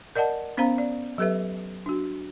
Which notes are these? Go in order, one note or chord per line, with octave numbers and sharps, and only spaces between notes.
A#4 D5 D#5 F#5 A5
B3 C#4 C5 F5 A#5
D5
F#3 G4 A4 B4 E5
D4 F#4